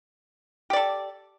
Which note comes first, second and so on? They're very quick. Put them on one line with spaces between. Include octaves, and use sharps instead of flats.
G4 D5 A4